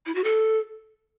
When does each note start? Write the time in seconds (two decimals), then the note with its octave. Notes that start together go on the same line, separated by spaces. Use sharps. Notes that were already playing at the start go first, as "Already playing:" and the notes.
0.06 E4
0.15 F#4
0.24 A4